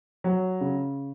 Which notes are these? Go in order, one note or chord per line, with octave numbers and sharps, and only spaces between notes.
F#3
C#3